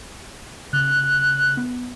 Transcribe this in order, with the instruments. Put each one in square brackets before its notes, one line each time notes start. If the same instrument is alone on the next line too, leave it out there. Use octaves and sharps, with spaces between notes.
[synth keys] C#3 [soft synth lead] F#6
[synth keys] B3